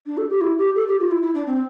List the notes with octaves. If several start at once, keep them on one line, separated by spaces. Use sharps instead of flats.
D4
A4
G4
E4
G4
A4
G4
F4
E4
E4
D4
C4